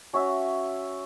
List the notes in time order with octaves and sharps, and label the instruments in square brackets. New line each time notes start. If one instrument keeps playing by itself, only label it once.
[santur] C#4 F#4 C#5 E5